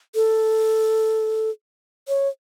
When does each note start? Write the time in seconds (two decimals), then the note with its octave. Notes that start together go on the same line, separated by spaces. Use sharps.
0.15 A4
2.08 C#5